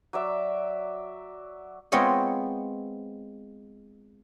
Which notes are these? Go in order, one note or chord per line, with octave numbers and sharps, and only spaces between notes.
F#3 D5 E5
G#3 B3 C4 F4 C#5 D#5